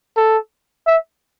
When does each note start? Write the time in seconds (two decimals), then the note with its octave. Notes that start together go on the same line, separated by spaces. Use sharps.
0.17 A4
0.86 E5